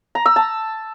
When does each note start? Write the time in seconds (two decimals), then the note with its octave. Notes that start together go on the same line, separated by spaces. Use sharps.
0.15 A#5
0.26 E6
0.36 A5